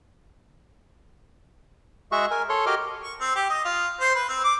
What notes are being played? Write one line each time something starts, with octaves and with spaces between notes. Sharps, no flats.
G#3 F#4 G#4 E5 F#5 C#6
A#4 G#5
A4 C#5 C6
F#4 G4 A#4 D#5 D6 F6
C#6
C4
G4
D#5
F4
C5
B4
C4
D6